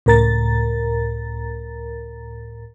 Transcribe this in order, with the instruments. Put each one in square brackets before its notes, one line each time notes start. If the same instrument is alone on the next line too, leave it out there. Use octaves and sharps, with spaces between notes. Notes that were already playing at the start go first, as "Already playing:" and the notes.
[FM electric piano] C#2 A2 A#4 A#5 A6